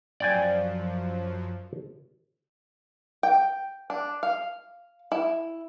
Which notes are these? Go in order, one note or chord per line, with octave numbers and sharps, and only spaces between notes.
F#2 F3 D5 G5 G#5
G5
D4
F5
E4